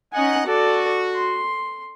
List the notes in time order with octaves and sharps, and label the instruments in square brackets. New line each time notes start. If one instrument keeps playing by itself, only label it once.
[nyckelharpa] C#4 G#5 [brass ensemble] D#4 D#5 F#5
[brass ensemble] F#4 [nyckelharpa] A4 D5
[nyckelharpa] C6